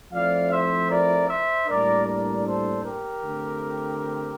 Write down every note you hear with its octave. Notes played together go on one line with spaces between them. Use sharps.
F3 A3 C4 E4 D5 F5
C5 E5
A#4 D5
C5 E5
A2 G3 A#3 D4 A#4 D5
A#4 D5
A4 C5
G4 A#4
D3 A3 C4